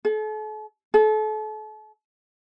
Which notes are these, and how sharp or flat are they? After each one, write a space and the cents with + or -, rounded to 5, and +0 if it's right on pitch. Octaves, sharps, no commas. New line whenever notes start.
A4 -40
A4 -35